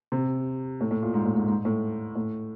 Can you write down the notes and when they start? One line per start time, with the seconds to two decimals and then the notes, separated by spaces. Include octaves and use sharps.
0.12 C3
0.81 A2
0.91 A2
1.03 A#2
1.14 G#2
1.26 A2
1.37 G#2
1.48 G#2
1.65 A2
2.16 A2